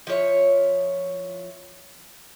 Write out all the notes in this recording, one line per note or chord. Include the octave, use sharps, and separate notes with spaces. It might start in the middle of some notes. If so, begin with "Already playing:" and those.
F3 E4 C#5